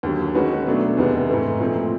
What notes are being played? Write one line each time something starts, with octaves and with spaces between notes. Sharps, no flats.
D#2 D3 F#3
D#3 G#3 C#4 F#4 B4
B2 F#3 A3 D4
E2 C3 D#3 G#3 B3
G#2 E3 A3
A#2 F3 A3 C4